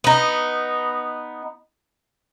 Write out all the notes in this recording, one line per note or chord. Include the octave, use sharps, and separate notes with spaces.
B3 D#4